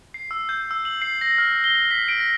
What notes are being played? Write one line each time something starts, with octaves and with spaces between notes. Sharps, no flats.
C7
E6
G6
E6
F#7
C7
A#6
F6
G7
B6
D7
A#6